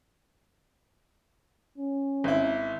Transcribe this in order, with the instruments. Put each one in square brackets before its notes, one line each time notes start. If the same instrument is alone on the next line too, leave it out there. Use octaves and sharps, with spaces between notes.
[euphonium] C#4
[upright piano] G#1 E4